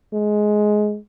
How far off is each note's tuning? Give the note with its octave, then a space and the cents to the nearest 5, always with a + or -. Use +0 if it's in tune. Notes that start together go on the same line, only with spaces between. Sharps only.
G#3 +15